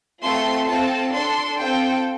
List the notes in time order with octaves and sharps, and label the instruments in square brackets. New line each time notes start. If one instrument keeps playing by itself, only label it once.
[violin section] A3 C4 F4 A4 C6
C4 F4 A4 A5
D4 A4 C6
C4 F4 A4 G5